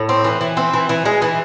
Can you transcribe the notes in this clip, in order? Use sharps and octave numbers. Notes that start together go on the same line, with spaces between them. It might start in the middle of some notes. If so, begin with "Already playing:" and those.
Already playing: A2
C4
E3
E3
C4
E3
E3
G#3
E3